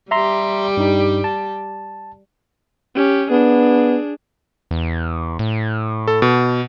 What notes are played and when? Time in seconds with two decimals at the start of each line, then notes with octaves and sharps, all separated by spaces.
0.11 G3 G4 E5 A#5 C6
0.77 G2 D#4
1.24 A5
2.95 C#4 G4
3.31 B3 D4 G#4
4.71 E2
5.39 A2
6.08 A4
6.22 B2